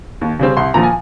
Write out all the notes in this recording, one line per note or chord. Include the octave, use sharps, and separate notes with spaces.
D#2
C#3 G3 C4
C2 C6
A#2 F3 A#5
G#5